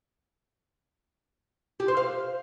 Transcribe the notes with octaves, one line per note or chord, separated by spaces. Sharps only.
G4
C5
F5